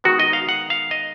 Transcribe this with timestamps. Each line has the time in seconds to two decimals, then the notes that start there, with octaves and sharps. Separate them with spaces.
0.04 D#3 G#3 B3 F#4
0.20 D#5
0.33 F5
0.49 F#5
0.70 F5
0.91 D#5